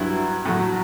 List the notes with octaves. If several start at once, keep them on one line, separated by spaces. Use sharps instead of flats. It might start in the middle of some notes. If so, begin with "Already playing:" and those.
Already playing: G2 F#3 E4
A2 F#3